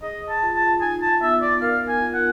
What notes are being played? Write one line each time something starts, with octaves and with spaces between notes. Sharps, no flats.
G#4 D#5
A5
F4
A5
D#4 G#5
A5
B3 E5
D5
A#4 F5
G#5
F4
F#5